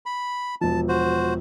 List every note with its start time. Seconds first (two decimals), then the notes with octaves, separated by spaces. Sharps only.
0.06 B5
0.61 E1 F3 A5
0.88 F#4 C5